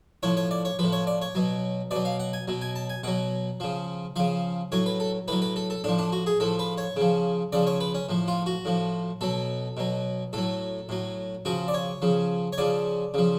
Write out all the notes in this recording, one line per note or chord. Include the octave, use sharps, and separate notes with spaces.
A2 F3 C#5
C#5
D5
C#5
A2 F3 B4
C#5
D5
C#5
B2 F#3
B2 F#3 D5
F5
F#5
G#5
B2 F#3
G#5
A5
G#5
B2 F#3 F#5
C#3 F3
C#3 F3 F5
A2 F#3 C#5
B4
A4
A2 F#3 B4
B4
A4
A4
A2 F3 D4
D4
F#4
G#4
A2 F3 A4
B4
C#5
C#3 F3
C#3 F3 D5
C#5
B4
C#4
A2 F3
F4
F#4
A2 F3
B2 F#3 A4
B2 F#3
A2 F#3 A4
A2 F#3
C#3 F3 F#4
D5
C#5
C#3 F3
C#5
C#3 F3 D5
C#3 F3